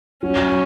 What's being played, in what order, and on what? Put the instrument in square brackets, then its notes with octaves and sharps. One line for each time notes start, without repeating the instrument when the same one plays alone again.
[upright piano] F#3 [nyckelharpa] C#4